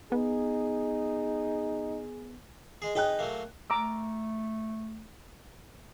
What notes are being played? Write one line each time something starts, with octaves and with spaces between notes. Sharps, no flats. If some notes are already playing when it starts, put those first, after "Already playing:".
B3 D#4 G#4
G#3 G#4
D#4 G#4 B4 D#5 G5 F#6
F#3 A3 A#3
A3 A#5 D6 E6